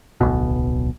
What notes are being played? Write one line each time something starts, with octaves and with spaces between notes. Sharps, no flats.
D1 B1 B2